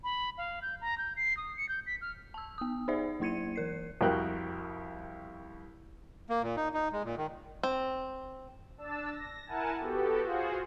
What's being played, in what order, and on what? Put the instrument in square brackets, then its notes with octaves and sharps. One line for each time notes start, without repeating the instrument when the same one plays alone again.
[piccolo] B5
F5
G6
A#5
G6
C7
D#6
C#7
G6
B6
F6
[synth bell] A5 E6
B3 D#6
D#4 G#4 C5 D5 E5
F#3 A#3 E4 G#6 C#7 D#7
E3 A#4 C7
[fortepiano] C2 F2 F#4 A#4 G5 F#6
[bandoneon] A#3
A#2
D#4
D#4
G#3
A#2
D#3
[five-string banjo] C4
[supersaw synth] D4 A5 E6
A#6
E4 A#4 F#5 G#5 A5
B3 F#4 G4 A4
F4 F#4 G#4 C5